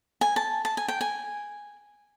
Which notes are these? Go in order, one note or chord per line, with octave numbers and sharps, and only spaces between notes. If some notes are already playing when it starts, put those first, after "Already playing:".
G#5
A5
A5
G#5
G5
G#5